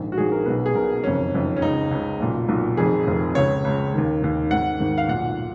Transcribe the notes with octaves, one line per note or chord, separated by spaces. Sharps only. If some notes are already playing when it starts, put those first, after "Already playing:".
Already playing: A#1 G#2 D#3
F#4
A#1 G#2 D#3 G#4
A#4
B1 B2 B4
G#4
B1 B2 A#4
F#1 F2 D#3 C#4
F#1 F2 D#3
C#4
C#2 C#3 D#4
C#2 C#3
B1 A#2
B1 A#2
F1 F2 D#3 G#4
F1 F2 D#3
C#2 C#3 C#5
C#2 C#3
D#2 D#3
D#2 D#3
G#1 G#2 D#3 F#5
G#1 G#2 D#3
F5
B1 A#2 F#5